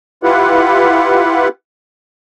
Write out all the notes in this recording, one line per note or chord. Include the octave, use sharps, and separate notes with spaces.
E4 F4 G4 B4 F#5